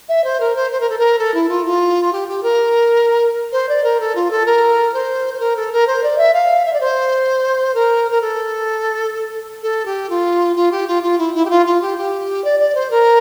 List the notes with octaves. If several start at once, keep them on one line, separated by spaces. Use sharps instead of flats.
E5
C5
A#4
C5
C5
A#4
A4
A#4
A4
E4
F4
F4
G4
G4
A#4
C5
D5
A#4
A4
F4
A4
A#4
C5
C5
A#4
A4
A#4
C5
D5
E5
F5
E5
D5
C5
A#4
A#4
A4
A4
G4
F4
F4
G4
F4
F4
E4
E4
G4
F4
F4
G4
G4
D5
D5
C5
A#4